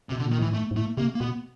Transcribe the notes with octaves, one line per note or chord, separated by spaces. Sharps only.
C3
B2
D3
A#2
D#3
A2 E3
G#2 A3
G#2
A2 A3
C3 A#3
A#3
B2 B3